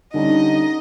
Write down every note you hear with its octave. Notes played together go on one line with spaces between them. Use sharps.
D3 G3 C#4 D#4 D#5